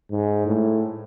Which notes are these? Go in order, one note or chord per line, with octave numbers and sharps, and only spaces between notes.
G#2
A2